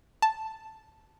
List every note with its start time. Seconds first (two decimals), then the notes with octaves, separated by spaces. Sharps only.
0.22 A5